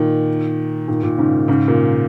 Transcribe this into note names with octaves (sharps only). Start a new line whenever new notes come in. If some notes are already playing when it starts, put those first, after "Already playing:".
Already playing: A#2 D#3
A#2 D#3
A#2
G#2 C#3
G#2 C#3
A#2